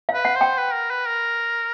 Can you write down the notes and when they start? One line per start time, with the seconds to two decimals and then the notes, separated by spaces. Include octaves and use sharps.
0.09 F5
0.14 B4
0.25 F#5
0.35 C5
0.41 G5
0.57 B4
0.73 A#4
0.90 B4
1.07 A#4